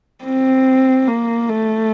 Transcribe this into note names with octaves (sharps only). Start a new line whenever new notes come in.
C4
A#3
A3